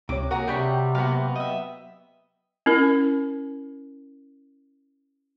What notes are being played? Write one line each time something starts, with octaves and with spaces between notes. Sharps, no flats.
C#2 C3 C#5 D6
A#3 F#4 G#4 A#5
C3 G3 C#5 G5 B5
F#3 A#3 B3 F#4 F5
D#5 E5
C#4 E4 A#4